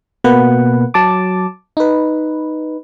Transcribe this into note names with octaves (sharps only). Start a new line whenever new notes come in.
B2 A#3 B4 F#5
F#3 A5 D6
D#4 B4